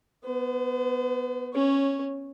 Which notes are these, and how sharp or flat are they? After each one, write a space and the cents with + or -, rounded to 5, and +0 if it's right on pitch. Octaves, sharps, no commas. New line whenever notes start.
B3 +0 C5 -45
C#4 -15 C#5 +0